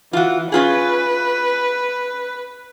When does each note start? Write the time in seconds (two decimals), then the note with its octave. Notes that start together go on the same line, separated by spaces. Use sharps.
0.13 E3 F4 F#4
0.52 C#4 F4 G#4 B4